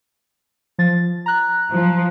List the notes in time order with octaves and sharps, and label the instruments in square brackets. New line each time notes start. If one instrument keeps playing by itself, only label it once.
[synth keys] F3 A6
A#5 F#6
[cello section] F3